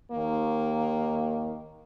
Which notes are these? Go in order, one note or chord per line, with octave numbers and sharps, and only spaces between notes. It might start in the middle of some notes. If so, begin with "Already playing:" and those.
D#2 D#3 A#3